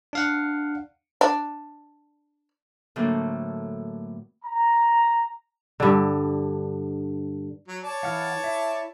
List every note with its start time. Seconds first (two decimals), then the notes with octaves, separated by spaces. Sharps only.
0.13 D4 F5 F#5
1.21 D4
2.96 A2 D3 F#3 A#3 C4
4.44 A#5
5.80 G2 D3
7.68 F#3
7.84 C#5 D5 A5
8.03 E3 F5 F#5 F6
8.44 E4 E5